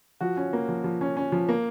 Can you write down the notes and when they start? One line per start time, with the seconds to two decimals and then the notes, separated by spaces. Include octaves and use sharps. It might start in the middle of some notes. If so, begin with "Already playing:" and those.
0.21 F3 F#4
0.37 C#4
0.53 A#3
0.69 F3
0.84 F3
1.01 C#4
1.17 C#4
1.32 F3
1.49 A#3